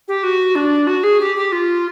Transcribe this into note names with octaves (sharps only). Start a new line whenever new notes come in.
G4
F#4
D4
F#4
G#4
G4
G4
F4